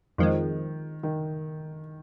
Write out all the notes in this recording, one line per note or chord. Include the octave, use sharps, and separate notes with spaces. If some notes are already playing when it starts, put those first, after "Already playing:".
F2 D#3 F3 G#3
D#3